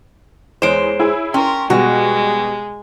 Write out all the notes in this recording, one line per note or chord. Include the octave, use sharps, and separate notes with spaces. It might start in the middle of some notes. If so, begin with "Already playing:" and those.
E2 G#3 C5 C#5 D7 E7
E4 G#4
C#4 A#4 G5 C6
B2 G3 G#3 F#4